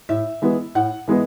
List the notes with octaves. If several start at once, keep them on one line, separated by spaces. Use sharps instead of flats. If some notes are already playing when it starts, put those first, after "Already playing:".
A2 E5
E3 G#3 B3
A2 F#5
E3 G#3 B3